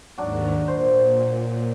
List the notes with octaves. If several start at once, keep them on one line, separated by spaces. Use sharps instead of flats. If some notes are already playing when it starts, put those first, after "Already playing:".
D#2 G#2 D#3 F#3 D4
A#2 C5